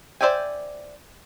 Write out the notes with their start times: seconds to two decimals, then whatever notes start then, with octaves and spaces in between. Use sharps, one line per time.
0.21 C5 D5 E5 G5 G#5